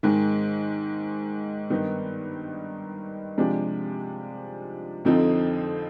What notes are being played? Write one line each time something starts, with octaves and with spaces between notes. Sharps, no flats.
G#2 D#3 G#3
G2 D#3 B3 D#4
C3 F3 G#3 D4 G4
F2 D3 F3 C4 D#4